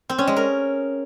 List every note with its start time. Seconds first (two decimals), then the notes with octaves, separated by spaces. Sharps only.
0.10 C4
0.18 C#4
0.27 G#3
0.36 A#4